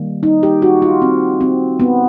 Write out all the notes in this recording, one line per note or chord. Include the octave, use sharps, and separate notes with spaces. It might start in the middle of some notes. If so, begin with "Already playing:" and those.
Already playing: D#3 G3 A#3
D#4
G4
F#4
F4
C4
C4
B3